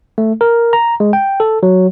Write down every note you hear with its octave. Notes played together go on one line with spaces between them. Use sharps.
A3
A#4
A#5
G#3
G5
A4
F#3